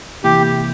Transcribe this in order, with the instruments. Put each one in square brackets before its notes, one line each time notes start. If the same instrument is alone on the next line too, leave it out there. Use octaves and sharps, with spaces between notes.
[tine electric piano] C3 E3 A#3 E4 [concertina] G4